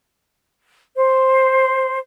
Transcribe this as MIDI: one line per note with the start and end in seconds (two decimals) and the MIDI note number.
0.96 1.98 72